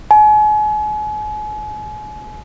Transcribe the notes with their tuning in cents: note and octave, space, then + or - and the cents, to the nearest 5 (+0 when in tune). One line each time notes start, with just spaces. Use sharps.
G#5 +40